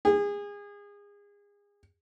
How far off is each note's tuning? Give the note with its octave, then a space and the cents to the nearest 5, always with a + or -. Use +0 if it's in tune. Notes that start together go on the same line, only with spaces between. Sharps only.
G#4 -30